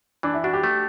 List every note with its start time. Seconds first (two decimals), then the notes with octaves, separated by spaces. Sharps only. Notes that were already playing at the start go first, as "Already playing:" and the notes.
0.23 E3 D4
0.34 E4
0.44 D4 F#4
0.53 G4
0.64 A3